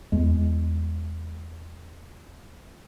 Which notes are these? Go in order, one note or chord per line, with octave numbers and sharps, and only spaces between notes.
E2 G#3